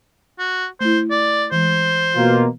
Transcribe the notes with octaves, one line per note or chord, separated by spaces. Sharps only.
F#4
A3 E4 C5
D5
E3 G#3 C5
B2 A#3 F4